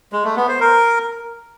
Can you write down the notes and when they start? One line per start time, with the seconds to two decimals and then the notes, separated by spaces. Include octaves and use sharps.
0.13 G#3
0.25 A3
0.36 B3
0.48 C5
0.60 A#4